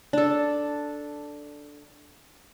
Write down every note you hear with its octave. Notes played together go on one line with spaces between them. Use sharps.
D4 A4